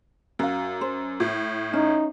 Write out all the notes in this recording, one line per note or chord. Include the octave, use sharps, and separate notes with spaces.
F#2 F#4 F5
C5
A2
C#4 D#4